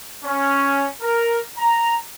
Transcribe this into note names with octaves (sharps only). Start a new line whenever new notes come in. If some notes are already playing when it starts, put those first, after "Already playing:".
C#4
A#4
A#5